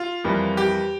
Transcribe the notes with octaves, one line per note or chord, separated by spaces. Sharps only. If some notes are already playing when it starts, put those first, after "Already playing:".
Already playing: F4
F2 E3 G3 A#3
G4